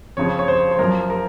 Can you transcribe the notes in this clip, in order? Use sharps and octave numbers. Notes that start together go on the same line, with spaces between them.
F2 C#3 F3 C#5
C#5
C5
C5
F#2 F3 A#4
A#4